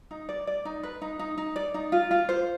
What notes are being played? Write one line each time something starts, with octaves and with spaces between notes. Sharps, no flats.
D#4
D5
D5
D#4
B4
D#4
D#4
D#4
D5
D#4
F4
F4
C5